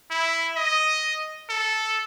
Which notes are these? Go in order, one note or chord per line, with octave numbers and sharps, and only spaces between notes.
E4
D#5
A4